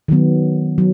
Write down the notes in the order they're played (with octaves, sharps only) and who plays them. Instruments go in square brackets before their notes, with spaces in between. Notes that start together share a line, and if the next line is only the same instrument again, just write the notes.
[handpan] D#3 F#3 B3
F#3